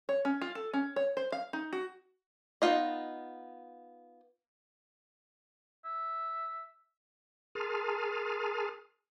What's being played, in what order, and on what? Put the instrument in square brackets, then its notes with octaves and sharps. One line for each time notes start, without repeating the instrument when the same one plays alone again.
[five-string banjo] C#5
C#4
F4
A4
C#4
C#5
C5
F5
D#4
F#4
B3 D#4 F4 D#5
[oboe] E5
[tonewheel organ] G#4 A#4 A5 C6 D#6 F6